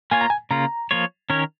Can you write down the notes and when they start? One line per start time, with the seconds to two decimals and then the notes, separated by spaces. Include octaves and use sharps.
0.11 A#3 F4 C#5 G#5
0.21 A#5
0.30 G#5
0.51 C#3 A#3 F4 A#5
0.91 F3 A#3 F4 C#5
1.30 D#3 C#4 A#4 C#5